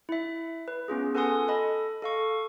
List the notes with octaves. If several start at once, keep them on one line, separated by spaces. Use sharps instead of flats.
E4 E5
B4
B3 C#4 F4 G#4
A4 B4 F#5 G#5 C6 D#6
A4 D#5 B5
A4 F5 C#6